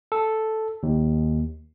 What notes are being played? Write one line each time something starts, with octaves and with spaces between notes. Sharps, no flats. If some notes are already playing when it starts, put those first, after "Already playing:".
A4
D#2